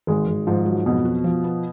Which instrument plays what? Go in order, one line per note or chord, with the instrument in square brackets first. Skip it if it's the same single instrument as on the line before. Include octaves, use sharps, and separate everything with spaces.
[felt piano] G#1 [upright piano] G#3
[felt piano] G#1
[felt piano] G#2 [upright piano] F3
[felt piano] F#3
[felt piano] F2 [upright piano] B2
[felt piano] F#4
F3
B3